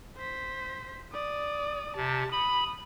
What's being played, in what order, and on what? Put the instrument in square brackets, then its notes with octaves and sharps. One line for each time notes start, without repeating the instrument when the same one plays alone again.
[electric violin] C5 B6
D5 D#6
[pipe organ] C3 [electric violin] A5
[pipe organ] B5 [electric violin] D#6